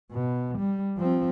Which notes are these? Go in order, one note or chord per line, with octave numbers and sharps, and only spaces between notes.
B2
G3
F3 C4